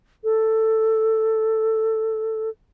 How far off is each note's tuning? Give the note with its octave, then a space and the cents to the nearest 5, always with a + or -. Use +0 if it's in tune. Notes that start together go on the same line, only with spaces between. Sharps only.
A4 +5